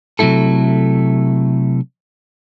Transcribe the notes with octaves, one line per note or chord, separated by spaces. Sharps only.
C3 F#3 A3 E4 A4